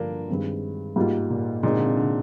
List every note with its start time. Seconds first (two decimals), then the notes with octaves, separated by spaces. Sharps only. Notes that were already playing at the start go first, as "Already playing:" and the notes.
Already playing: G2 D3 F3 A#3 D4
0.29 G2 D#3 G#3 C4
0.96 G#2 G3 A#3 F4
1.30 A#2
1.63 A#2 G#3 C4 D#4
1.76 D3
1.86 C3
1.97 D3